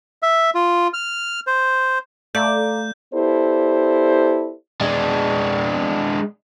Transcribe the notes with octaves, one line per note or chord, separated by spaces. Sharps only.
E5
F4
F6
C5
A3 A4 D5 F5 A#5 G6
B3 E4 G4 A4 C5 D5
G#3 D4